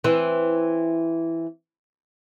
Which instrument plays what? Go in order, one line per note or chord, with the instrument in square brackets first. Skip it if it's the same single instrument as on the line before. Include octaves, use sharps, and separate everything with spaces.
[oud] E3 C4